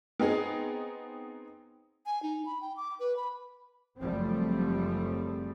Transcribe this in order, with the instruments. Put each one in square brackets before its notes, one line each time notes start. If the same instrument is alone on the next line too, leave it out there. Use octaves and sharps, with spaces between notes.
[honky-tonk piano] B3 C4 D#4 G#4
[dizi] G#5
D#4
B5
G5
D6
B4
B5
[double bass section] F#1 F#2 F3 G3 A3 C4